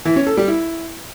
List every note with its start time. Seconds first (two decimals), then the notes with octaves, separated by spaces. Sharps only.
0.05 E3
0.16 C#4
0.27 A4
0.37 G3
0.48 E4